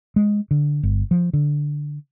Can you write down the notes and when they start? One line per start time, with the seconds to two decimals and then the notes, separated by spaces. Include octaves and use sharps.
0.16 G#3
0.51 D3
0.83 G1
1.11 F3
1.33 D3